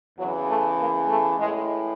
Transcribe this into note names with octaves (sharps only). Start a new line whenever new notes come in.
E2 C#3 E3 F#3
A3
A#3
A3
A2 E3 G#3